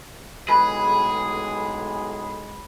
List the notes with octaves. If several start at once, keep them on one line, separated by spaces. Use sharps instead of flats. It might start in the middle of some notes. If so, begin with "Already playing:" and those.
B1 A2 G#3 G#4 B4